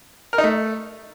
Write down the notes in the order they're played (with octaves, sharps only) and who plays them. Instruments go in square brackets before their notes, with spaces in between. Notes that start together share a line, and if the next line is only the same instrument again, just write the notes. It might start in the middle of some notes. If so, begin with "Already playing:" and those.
[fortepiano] A#4
D#4
A3